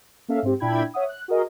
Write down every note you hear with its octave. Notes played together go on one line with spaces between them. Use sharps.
A#3 C#4 A4 E5 F5
G#2 C4 G4
A#2 D4 E4 G5 B5 G#6
C#5 E5 F#5 D#6
F#6
F#4 G#4 A#4 D#5